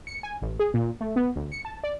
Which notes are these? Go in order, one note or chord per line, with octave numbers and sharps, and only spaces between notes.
C#7
G#5
A1
G#4
A#2
A3
B3
D2
C#7
A5
D5